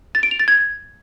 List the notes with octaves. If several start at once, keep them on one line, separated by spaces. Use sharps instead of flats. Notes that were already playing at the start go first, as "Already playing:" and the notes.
A6
D7
F7
A6
G#6